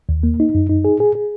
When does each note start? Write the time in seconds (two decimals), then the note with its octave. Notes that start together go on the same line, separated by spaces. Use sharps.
0.09 D#2
0.23 A#3
0.40 D#4
0.55 F#2
0.69 D#4
0.85 G#4
1.00 G#4
1.15 G#4